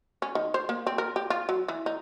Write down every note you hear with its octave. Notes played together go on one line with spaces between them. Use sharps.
C#4
D#3
C5
A#3
C4
A#4
G4
F4
F#3
E3
D#4